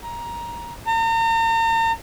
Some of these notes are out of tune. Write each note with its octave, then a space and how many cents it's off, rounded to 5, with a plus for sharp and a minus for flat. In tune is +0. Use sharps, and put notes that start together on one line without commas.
A#5 +15
A#5 -40